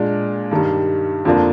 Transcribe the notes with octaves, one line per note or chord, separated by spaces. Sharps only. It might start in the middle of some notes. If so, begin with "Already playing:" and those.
Already playing: A#2 G#3 D4
G2 D#3 G3
F2 D3 F3 A#3 D4